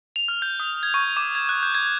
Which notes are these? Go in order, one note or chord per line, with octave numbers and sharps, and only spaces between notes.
F7
F6
G6
D#6
G#6
C#6
D6
G#6
F#6
G6
G#6